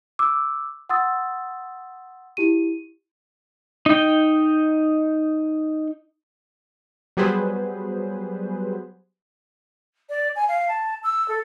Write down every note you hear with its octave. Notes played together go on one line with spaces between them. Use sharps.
D6 E6
F#5 C6 D#6 E6 A6
E4 G4 D#7
D#4 G5
F#3 G3 B3 G#4 B4 C5
D5
G#5
F5
A5
E6
A4